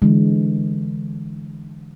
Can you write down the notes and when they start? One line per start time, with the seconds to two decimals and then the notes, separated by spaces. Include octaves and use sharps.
0.02 D3 E3 G#3